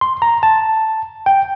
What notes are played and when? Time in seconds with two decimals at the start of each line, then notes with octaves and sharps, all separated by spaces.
0.01 C6
0.22 A#5
0.43 A5
1.26 G5